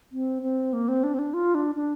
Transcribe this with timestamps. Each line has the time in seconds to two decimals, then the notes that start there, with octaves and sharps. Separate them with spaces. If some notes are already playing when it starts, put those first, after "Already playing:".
0.12 C4
0.42 C4
0.73 A#3
0.88 C4
1.04 D4
1.14 C4
1.19 D4
1.34 F4
1.55 D4
1.75 D4